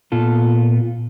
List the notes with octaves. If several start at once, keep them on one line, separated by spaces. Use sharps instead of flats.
A#2 B3 F4 A4